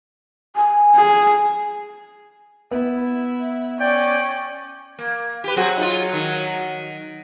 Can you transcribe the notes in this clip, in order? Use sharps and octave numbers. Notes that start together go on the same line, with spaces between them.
G#5
G#4
B3 E4
C#4 D5 G5
A#3
G4 B4
F#3 C4 F#4 G#4
D#4 F4
D#3